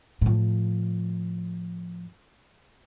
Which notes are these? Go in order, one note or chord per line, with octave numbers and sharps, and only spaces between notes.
A2 F3